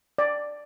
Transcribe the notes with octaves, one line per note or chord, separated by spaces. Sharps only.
D5